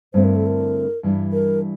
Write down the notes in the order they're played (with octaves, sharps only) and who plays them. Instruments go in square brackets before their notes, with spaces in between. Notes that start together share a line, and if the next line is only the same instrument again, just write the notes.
[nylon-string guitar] G2 D3 A3 C4 E4 [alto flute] C5
[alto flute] A#4
A4
A#4
[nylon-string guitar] G2 E3 G3 D4
[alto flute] A#4